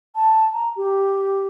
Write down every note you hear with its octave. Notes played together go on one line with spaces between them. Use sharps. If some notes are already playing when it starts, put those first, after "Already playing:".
A5
A#5
G4